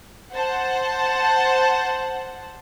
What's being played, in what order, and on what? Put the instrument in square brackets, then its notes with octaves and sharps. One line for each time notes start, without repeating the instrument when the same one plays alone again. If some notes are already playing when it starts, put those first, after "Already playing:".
[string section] C5 F#5 A5